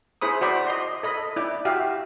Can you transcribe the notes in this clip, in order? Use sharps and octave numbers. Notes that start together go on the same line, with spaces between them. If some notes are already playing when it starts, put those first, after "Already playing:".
E4 G#4 C5 B5 D#6
F#4 C5 D5 B5
D#5 C6
A4 D#5 B5
E4 D5
F#4 G4 E5 F5